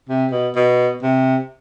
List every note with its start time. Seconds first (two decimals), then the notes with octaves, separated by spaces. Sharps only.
0.09 C3
0.32 B2
0.55 B2
1.03 C3